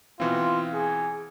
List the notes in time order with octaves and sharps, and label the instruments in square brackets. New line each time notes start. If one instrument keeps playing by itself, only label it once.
[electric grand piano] B2 E3 C4 [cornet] F4
[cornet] G#4